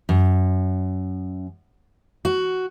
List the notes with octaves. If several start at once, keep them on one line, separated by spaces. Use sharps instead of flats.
F#2
F#4